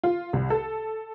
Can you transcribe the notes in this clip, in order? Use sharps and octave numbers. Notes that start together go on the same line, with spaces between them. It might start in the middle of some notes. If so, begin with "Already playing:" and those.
F4
C2
A4